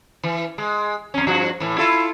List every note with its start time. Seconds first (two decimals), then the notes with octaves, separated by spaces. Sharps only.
0.23 E3
0.58 G#3
1.14 F2 C#4
1.27 G2 F3 F#4
1.60 A2 E3
1.78 E4 F4 A4